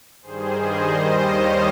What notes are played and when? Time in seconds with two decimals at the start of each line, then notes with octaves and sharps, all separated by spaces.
0.22 G2 D#3 G3 G#4 C5
0.57 C5 D#5
0.91 D#2 D#3 G3
1.25 C#5 F5